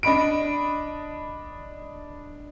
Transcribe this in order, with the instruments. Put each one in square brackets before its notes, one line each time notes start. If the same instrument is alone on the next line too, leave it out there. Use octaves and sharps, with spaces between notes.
[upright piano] D4 D#5 B5 D7